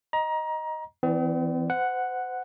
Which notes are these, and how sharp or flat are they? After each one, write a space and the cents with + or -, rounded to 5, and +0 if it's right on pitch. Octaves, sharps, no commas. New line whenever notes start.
D#5 +0 A#5 +25
E3 +0 C4 -45 D5 +0
C5 -35 F#5 +0